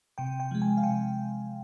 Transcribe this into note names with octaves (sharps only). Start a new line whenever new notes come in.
C3 G5
G5
F3 G#3
G#5
F5
C3 G5